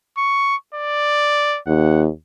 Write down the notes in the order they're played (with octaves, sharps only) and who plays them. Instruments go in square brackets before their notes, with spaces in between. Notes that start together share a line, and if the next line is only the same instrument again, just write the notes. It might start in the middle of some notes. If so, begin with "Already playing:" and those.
[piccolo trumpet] C#6
D5
[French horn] D#2 [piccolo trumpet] F#5